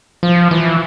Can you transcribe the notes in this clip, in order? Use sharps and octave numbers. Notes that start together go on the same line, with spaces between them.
F3
E3